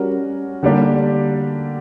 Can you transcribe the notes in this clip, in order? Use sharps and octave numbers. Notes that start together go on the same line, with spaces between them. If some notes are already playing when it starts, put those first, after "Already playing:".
Already playing: G3 C#4 F#4 A#4
D3 G3 A#3 D4 G4